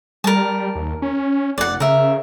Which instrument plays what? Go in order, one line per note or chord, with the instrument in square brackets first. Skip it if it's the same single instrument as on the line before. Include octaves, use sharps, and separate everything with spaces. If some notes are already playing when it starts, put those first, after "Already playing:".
[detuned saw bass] G3 [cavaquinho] A#4 A5
[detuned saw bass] D#2
C#4
[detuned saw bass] F1 [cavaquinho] D5 F#5
[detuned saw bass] C#3 [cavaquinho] A#4 E5